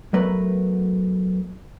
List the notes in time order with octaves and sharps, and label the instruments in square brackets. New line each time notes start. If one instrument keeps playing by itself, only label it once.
[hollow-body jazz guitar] F#3 A3 B3 A#4 B4